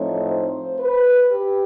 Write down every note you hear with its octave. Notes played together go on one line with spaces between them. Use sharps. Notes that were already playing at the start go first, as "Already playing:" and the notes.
Already playing: A2 F3 A3 C4 D#4 C#5
C5
B4
G4